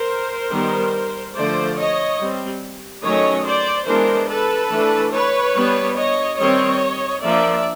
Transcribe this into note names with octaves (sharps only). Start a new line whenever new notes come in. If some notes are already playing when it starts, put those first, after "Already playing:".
Already playing: A#4 C5
D#3 G3 B3
D3 F3 A3 C5 D5
C#5 D#5
G3 C4
D#3 F#3 A3 C#4 C#5 D#5
C5 D5
E3 G#3 B3 D4 A#4 C5
A4 B4
E3 A3 D4
B4 C#5
G3 B3 D4
C#5 D#5
D#3 G3 C4 C#5 D#5
F3 A#3 D4 D5 E5